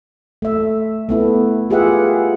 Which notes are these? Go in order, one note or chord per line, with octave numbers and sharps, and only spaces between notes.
A3 E5
A3 B3 E4
F4 G4 G#4 B4 E5 F#5